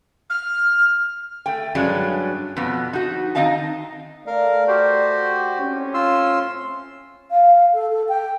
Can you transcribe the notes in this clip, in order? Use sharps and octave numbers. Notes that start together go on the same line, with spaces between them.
F6
A3 G5
G2 F#3 G#3 C#4 D4
F2 B2 B3
D#4 F#4
D#3 C4 D#4 D#5 F5 A5
A3 A#4 D5 F5
F#4 G4 C5
A2 C4 C#4
F4 C6 E6
F5
A4
A4
G5